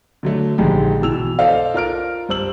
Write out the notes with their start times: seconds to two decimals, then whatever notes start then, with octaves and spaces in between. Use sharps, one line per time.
0.23 D3 F#3 A3
0.58 A#1 G#2 D3 G#3 G4
1.01 B2 E3 E6 F7
1.39 A4 C5 D5 D#5 F5
1.74 F4 A#4 F6 D7
2.29 G2 C5 E6 F#7